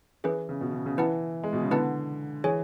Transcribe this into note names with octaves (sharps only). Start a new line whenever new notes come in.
E3 C#4 G#4 B4
C#3
B2
C#3
C#3
E3 C#4 E4 B4 F#5 A5
G#3
B2
C#3
D3 B3 E4 B4 F#5 A5
E3 G#4 C#5 G#5